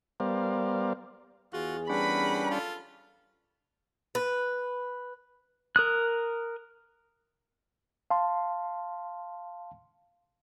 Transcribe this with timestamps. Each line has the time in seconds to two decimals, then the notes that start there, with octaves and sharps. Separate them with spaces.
0.20 G3 B3 A#4 C5 D5 F5
1.53 E2 F4 F#4 G#4
1.90 G3 C#4 D4 A#4 B4 F#5 B5
2.51 F4 A4
4.15 B4
5.76 A#4 D#6 F#6
8.10 F5 A5 C6